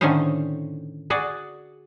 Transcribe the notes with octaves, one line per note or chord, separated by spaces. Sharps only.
A2 D3 D#3 C#4 D#4 C5
F#4 G#4 D5